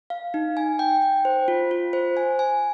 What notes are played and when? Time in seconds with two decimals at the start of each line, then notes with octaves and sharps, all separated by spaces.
0.10 F5
0.34 D#4
0.57 G#5
0.79 G5
1.02 G5
1.25 C5
1.48 F4
1.71 F4
1.93 C5
2.17 G#5
2.39 G#5